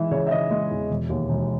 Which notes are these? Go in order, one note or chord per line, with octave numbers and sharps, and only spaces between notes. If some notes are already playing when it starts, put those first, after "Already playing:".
Already playing: E3 G#3 E5
C#3 C#5
E5
C#3 D#5
G#3
E2
E1
D#2
E1